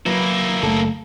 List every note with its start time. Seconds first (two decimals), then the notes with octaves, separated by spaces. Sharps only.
0.06 F#3 A#3 E4 B4
0.63 F#1 B2 A3 A4